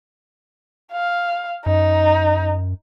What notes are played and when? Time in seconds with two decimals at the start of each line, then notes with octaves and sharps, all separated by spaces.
0.92 F5
1.66 F#2 D#4